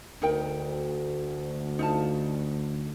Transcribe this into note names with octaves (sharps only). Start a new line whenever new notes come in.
D2 D#4 A#4 G5
D#4 F4 A5